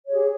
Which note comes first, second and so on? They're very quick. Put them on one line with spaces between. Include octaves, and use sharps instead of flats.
C#5 G#4 G4